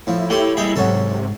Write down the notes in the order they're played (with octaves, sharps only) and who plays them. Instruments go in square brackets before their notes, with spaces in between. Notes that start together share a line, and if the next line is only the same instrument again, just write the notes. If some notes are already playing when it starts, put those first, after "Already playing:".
[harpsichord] A2 F3 [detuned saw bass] E4
[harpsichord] A3 G4 C6 [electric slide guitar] C#5 G5
[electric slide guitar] G3 A#3 G#4 [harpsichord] D#5 G5
[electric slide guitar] E2 G#2 [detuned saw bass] C3 [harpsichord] F#3 C#4 A4